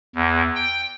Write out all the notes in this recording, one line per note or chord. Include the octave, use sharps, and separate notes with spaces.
E2
G5